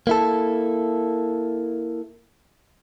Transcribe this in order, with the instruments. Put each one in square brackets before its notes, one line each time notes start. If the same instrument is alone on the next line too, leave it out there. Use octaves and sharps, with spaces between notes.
[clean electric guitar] A#3 E4 A4